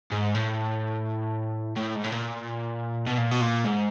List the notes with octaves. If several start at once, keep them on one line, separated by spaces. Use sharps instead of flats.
G#2
A2
A2
G#2
A2
A#2
B2
A#2
B2
A#2
G#2